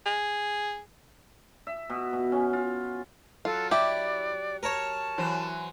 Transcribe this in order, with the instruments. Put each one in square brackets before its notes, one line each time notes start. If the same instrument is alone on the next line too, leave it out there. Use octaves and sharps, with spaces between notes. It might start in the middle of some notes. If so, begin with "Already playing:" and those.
[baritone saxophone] G#4
[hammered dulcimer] E5
B2
B2
C#4
F4
[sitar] F#3 [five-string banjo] F4 [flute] A4
[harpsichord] E4 [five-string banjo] G4 [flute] D5
[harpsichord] A#4 C#5 [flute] A5
[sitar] E3 F#3 C5